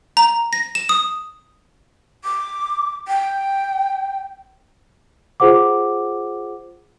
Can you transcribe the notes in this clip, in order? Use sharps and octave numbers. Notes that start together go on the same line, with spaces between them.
A#5
A#6
E7
D#6
D6
G5
F4 G#4 C5 F#5 D6